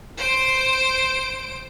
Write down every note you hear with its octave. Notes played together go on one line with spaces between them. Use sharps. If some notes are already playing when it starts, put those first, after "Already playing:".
C5 D7